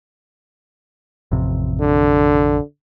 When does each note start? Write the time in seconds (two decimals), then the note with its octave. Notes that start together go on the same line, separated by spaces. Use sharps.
1.32 A1 F2 C3
1.80 D3